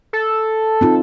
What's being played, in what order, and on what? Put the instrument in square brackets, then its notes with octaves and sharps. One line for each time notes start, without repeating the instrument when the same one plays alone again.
[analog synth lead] A4
[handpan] C4 D#4 F4